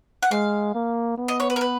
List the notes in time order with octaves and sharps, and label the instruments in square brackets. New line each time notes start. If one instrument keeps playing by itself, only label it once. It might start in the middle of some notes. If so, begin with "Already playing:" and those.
[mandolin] F#5
[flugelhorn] G#3 [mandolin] F5
[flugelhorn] A#3
B3
[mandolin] D#5
C#5
B4
A#4
B4